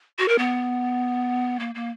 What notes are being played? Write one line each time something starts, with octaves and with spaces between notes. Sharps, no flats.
F#4
A#4
B3
A#3
A#3